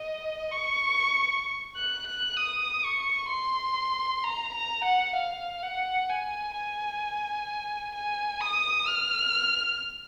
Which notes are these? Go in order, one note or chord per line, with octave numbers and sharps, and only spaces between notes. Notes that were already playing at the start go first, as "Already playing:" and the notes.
Already playing: D#5
C#6
F#6
F#6
D#6
C#6
C6
A#5
A#5
F#5
F5
F#5
G#5
G#5
G#5
D#6
F6